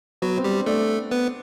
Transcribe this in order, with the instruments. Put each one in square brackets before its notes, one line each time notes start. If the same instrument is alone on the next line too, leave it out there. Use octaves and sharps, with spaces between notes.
[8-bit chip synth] F#3 F#4 [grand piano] B3
[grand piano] C4
[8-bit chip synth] G3 G4
[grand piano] D4
[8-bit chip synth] A3 A4 [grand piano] D4
[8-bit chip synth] B3 B4